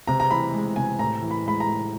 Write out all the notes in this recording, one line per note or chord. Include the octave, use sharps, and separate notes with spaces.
C3 A#5
A#5
E3 B5
G#3
C3 G#5
A2 A#5
E3
B5
G#3 B5
A#5
A2